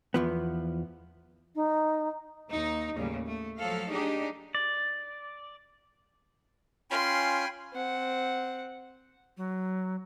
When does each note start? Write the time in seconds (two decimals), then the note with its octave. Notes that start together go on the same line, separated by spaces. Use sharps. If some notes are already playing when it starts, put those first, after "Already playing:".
0.14 E2 F3 B3
1.55 D#4
2.49 D#2 D#4
2.95 D#2 A2 C#3 G3
3.25 A3
3.58 F3 F#3 A4 F5
3.91 D4 D#4 G4 G#4
4.55 D5
6.91 C#4 F4 G5 G#5 B5 C6
7.73 C4 F#5
9.37 F#3